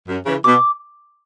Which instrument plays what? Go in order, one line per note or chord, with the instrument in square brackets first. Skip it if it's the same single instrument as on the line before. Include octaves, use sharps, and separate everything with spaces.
[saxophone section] F#2
C#3 E3
[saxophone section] B2 [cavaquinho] D6